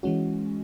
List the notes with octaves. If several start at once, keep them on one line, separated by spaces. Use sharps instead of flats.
E3 G#3 C#4 F#4